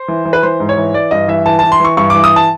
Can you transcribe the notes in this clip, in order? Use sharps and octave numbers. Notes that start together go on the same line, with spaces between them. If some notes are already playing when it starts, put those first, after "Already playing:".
Already playing: C5
E3
E3
B4
E3 C5
G#2
C#5
E3
E3 D5
G2 D#5
E3 E5
E3 A5
E3 A5
C6
E3 C#6
G2 C#6
E3 D6
D#6
A5